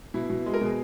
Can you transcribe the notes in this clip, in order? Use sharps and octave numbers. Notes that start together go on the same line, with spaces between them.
B2 E4
B2
G#3
A#4
B2 G#4